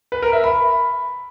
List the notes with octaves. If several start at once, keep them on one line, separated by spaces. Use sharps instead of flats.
B4
A#4
E5
B5